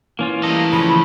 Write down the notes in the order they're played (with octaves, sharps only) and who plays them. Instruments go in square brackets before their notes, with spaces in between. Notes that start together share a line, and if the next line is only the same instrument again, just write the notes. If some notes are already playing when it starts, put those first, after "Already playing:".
[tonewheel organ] E3 [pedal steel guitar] A#3 C#4 F4
[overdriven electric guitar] A2 A4 [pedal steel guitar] G3 A#3 D#5
[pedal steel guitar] C#3 F3 C#4 [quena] B5